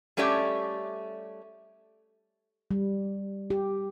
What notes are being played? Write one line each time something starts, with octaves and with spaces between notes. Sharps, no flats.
G3 A3 C#4 G4 D5 E5
G3
G4